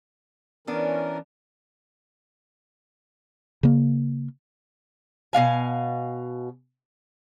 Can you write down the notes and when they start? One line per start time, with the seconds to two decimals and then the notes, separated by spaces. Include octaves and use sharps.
0.67 E3 B3 C#4 D4 A#4
3.63 C#3 A#3
5.33 B2 D4 F5 G#5